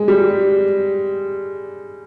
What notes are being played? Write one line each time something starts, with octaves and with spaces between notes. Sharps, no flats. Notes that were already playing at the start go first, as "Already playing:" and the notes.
Already playing: G#3
G3